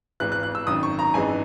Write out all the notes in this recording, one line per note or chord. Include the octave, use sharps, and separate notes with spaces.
G#1 G#2 E3 F#6
F#6
F#6
E6
G#1 F#2 D#3 D#6
C#6
A#5
G#1 F#2 E3 G#3 D#4 G#5